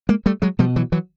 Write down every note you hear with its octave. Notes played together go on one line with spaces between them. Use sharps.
G#3 A#3
G3 A3
F#3 G#3
B2 F3 G3
E3 F#3
E3 F#3